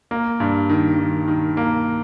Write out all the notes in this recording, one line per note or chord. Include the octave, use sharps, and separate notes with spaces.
A#3
G2
D#3
D#3
D#3
A#3